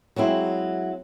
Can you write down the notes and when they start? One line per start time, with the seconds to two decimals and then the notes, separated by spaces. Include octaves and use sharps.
0.16 F#3 G#3 C4 E4